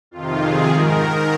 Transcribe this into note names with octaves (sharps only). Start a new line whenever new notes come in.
F2 C3 D#3 F4
G#4
G#2 D#3 A#4
A#4